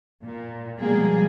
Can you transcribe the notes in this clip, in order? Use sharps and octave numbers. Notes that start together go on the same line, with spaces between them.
A#2
B2 F3 G3 G#3 A#3 G#4